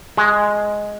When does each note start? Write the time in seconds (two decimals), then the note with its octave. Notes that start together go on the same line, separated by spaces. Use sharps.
0.17 G#3